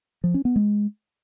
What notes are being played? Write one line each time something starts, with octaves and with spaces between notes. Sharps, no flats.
F3
C#4
B3
G#3